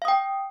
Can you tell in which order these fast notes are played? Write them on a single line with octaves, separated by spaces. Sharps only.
F5 D#6 G5